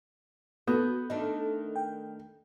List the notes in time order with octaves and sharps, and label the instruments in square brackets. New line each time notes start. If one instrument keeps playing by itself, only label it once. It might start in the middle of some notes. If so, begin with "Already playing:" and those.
[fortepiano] B3 [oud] F#4 [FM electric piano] A4 D#6 G6
[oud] D#3 A3 D4 [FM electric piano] D#5
[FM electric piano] G5